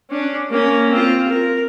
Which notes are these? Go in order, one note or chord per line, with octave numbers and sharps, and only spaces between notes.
C#4 D4
A#3 C#4
C4 F4
A#4